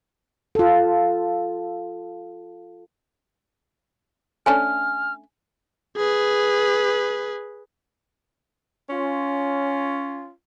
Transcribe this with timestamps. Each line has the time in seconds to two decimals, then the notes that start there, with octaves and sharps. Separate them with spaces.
0.55 F4 A4
4.46 A3 C#4 D4 G#5 F6
5.97 G#4 B4
8.90 C#4 F4